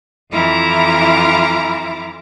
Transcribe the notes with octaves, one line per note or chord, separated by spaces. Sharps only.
F2 E3 E4 F4 A#5 D6